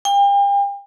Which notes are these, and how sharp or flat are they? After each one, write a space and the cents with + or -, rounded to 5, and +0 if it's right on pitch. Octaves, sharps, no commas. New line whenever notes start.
G5 +40